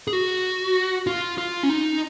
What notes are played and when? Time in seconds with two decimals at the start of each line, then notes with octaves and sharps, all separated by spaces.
0.07 G#4
0.13 F#4
1.07 F4
1.38 F4
1.63 C#4
1.69 D#4